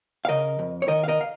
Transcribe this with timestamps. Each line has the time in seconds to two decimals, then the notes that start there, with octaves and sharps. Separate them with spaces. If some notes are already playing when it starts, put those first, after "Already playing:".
0.25 F5
0.29 C#3 A#4 D#5
0.59 F2
0.82 C#5
0.88 D#3 A#4 D#5
1.03 F5
1.08 A#4 D#5
1.21 F5